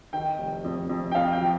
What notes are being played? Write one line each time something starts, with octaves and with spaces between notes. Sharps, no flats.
D#3 G5
F1
F2
F2
G5
F2 F5
G5
F3